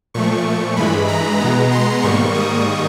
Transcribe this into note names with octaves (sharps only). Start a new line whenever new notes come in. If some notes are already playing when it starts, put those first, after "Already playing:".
A#2 F3 A3 C#6
G2 E3 G#3 B5
A#5
B2 G#3 B3 A#5
C6
G#2 D#3 G3 A#3 C#6
D#6